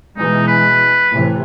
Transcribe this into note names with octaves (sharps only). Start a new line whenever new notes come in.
B2 E3 G#3 D#4
B4
A2 C3 E3